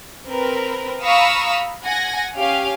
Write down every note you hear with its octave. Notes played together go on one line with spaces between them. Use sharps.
C4 A#4 B4
F5 A#5 B5 C#6 D#6 E6
F#5 G#5 G#6 A#6
C#4 G4 F5 G#5